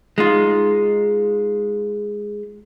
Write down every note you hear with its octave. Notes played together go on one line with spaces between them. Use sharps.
G#3 D#4 F4